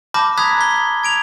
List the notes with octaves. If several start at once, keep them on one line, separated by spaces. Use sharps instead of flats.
A5 B5 D6 F6 G6 A#6
A#5 B5 D#6 F#6 G#6 B6
B6 G7
G#6 D7 F7